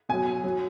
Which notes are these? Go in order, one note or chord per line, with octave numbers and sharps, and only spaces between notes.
B2 F#3 G#5
F#3